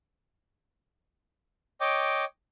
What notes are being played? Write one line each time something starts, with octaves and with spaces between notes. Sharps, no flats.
C#5 D#5 G5 D6